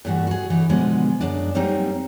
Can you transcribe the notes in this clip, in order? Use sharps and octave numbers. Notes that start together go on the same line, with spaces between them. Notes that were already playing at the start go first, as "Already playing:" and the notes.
G2 A#2 E3 A3 F#4
F#4 G#4
D3 E3 D#4 C#5
B2 D3 F3 G#3 B3
F#2 G#3 D4
F#3 G3 A#3 C4 D#4